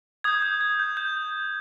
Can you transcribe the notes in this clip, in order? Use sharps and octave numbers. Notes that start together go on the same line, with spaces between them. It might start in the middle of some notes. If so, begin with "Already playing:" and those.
D#6 G6 G#6
G6
G#6
G6
G6